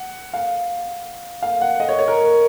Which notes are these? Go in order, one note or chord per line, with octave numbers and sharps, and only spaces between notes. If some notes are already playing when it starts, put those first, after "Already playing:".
Already playing: F#5
F5
F5
F#5
D#5
C#5
C#5
A#4